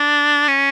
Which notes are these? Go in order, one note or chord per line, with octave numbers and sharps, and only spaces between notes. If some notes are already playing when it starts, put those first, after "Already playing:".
Already playing: D4
C#4